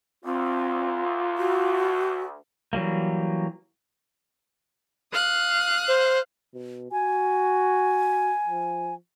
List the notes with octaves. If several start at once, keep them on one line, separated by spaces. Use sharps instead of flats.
D2 C4 F4
F#4
E3 F#3 G3 A#3
F5 D#6 F#6
C5
B2
F#4 G#5
F3